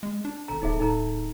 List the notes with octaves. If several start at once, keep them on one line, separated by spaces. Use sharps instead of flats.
G#3
D4
G#1 B2 A4 A#5
D1 D#4 G#4 E5
A2 D#4 A4 G#5 A#5